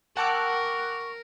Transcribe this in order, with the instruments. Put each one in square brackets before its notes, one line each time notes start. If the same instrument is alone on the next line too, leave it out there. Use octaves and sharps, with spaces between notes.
[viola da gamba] A#4 [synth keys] F#5 D6 F#6 [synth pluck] G5 A5 E6 [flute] C#6